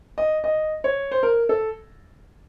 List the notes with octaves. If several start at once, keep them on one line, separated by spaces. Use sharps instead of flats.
D#5
D#5
C#5
C5
A#4
A4